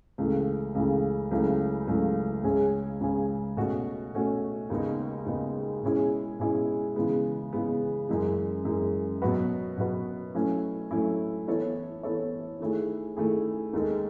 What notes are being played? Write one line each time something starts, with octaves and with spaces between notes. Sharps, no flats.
C#2 C#3 E3 A3
C#2 C#3 E3 A3
C#2 C#3 F#3 A3 E4
C#2 C#3 F#3 A3 E4
C#2 C#3 G#3 C#4 G#4
C#2 C#3 G#3 C#4 G#4
B2 A3 C#4 F#4
B2 A3 C#4 F#4
D#2 C#3 G#3 B3 D#4
D#2 C#3 G#3 B3 D#4
B2 G#3 C#4 E4 G#4
B2 G#3 C#4 E4 G#4
C#3 E3 G#3 B3
C#3 E3 G#3 B3
F#2 E3 G#3
F#2 E3 G#3
B2 F#3 B3 F#4 B4
B2 F#3 B3 F#4 B4
F#3 A3 C#4 E4
F#3 A3 C#4 E4
E3 B3 E4 A4 C#5
E3 B3 E4 A4 C#5
D#3 A3 E4 G#4
D#3 A3 E4 G#4
D#2 D#3 G#3 D#4 A4